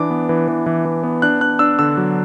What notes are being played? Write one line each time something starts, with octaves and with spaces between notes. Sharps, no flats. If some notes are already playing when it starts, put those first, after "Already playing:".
Already playing: E3 D4 D6
B3
E3
E3
E3
E3
B3
D4 F#6
D4 F#6
D4 E6
D3 E6
F#3